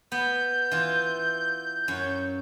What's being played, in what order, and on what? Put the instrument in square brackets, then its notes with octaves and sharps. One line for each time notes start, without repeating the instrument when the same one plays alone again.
[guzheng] B3 [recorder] G6
[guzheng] E3 F4
F#2 C#5